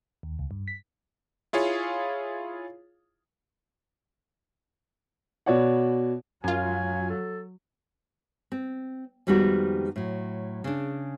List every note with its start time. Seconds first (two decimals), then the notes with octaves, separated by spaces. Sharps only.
0.23 D#2
0.39 C#2
0.51 G2
0.68 B6
1.53 E4 F4 G#4 C#5 F5
5.46 B2 F#4 C#5 D5 F#5
6.44 F#2 F#3 F4 G#5
7.10 A4
8.52 C4
9.27 F2 D#3 G3 G#3 B3 F#4
9.96 A2 F#3
10.64 C#3 D4